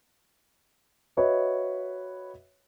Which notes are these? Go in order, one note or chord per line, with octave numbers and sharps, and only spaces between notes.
F#4 B4 C#5 D#5 E5